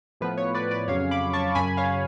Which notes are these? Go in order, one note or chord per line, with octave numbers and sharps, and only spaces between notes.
A2 F3 B3 B4
C#5
B4 D5
B4 D5
F2 C#3 F#3 C#4 C#5 F5
B5 D6
A5 C#6
F#2 C#3 F#3 G#5 B5
C#5 F5